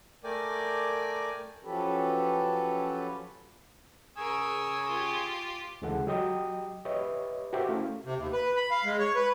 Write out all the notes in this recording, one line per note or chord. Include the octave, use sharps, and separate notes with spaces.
A3 A#4 D5 G5 G#5 D6
F3 F#3 C#4 G4 A4 B4
A#4 G#5 C#6 D#6 E6
F4 G4
D2 C#3 E3 G#3 A4 F#5
F#3 G4 D#5 G5 D#6
G4 B4 C#5 D#5 E5
F#4 G4 A#4 C5 E5
A3 C#4 E4 F5
C3
D#2
B4
B5
F5
G#3
C#5
B4